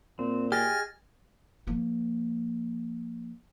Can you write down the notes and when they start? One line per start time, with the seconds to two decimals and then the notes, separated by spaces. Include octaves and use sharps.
0.19 A#2 C4
0.52 G4 G#4 D#5 G#5 F6 A6 A#6
1.67 F3 A#3